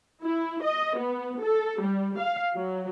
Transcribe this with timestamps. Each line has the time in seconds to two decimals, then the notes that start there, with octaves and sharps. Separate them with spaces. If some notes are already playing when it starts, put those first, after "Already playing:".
0.24 E4
0.64 D#5
0.97 B3
1.42 A4
1.82 G3
2.19 F5
2.54 F#3